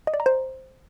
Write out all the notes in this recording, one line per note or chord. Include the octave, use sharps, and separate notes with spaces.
D#5
D5
A#5
C5